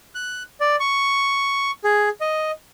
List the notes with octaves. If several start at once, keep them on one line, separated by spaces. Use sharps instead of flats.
F#6
D5
C#6
G#4
D#5